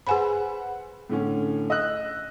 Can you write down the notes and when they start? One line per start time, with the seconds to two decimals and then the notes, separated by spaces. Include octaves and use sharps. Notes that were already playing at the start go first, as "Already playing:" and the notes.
0.07 G#4 B4 C5 F#5 G#5 B5
1.10 A2 D3 C#4
1.70 D#5 E6 F#6